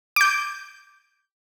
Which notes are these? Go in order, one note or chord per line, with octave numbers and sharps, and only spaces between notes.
D6 G6